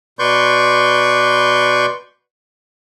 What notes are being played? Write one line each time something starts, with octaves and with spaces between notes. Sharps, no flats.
B2 B4 D5 C6 C#6 G6